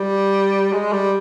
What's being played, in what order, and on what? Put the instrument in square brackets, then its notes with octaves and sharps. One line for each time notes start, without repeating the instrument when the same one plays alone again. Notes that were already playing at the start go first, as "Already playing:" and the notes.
Already playing: [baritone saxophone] G3
G#3
G3